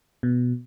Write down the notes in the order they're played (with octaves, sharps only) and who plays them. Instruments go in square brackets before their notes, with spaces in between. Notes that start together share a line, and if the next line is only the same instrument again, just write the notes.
[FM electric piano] B2